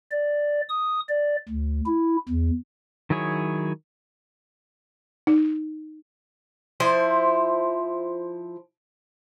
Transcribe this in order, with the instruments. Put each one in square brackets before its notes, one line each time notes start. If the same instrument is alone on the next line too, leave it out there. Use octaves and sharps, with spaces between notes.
[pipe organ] D5
D#6
D5
D2
E4
E2
[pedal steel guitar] D#3 F#3 E4 G#4 C#5
[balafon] D#4
[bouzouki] F3 E4 C5